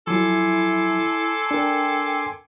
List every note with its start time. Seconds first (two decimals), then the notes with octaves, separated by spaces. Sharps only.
0.07 F3 F#3 E4 A4 G#5 C6 D6
1.51 D4 A#4 G5